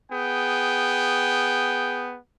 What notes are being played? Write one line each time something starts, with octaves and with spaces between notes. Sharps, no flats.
B3 G#4 G5